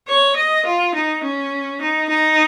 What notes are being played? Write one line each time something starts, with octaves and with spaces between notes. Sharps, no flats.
C#5
D#5
F4
D#4
C#4
D#4
D#4